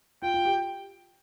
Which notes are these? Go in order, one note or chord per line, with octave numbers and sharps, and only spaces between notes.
F4 G5
F4
G4